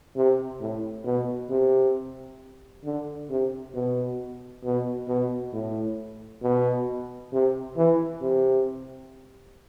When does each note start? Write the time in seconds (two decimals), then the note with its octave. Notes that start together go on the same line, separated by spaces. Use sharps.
0.16 C3
0.61 A2
1.05 B2
1.50 C3
2.85 D3
3.30 C3
3.75 B2
4.64 B2
5.08 B2
5.53 A2
6.43 B2
7.33 C3
7.77 E3
8.22 C3